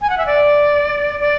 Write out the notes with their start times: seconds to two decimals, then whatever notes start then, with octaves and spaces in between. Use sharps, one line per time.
0.01 G#5
0.10 F#5
0.18 E5
0.26 D5
1.20 D5